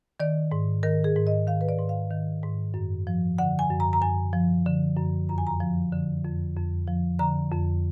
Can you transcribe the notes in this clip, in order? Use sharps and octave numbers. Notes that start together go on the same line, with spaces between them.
D#3 D5
G#2
D#3 A#4
G#4
G#2
D#5
D#3 F5
B4
D5
G#2
F5
D#3
G#2
F#2
F3
D3 F#5
G#5
F#2
A#5
A#5
F#2 G#5
F3
D3
F#2
F2 A#5
G#5
A#5
F3
D3
F2
F2
F3
D3 A#5
F2